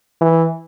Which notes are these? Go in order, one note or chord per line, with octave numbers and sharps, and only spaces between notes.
E3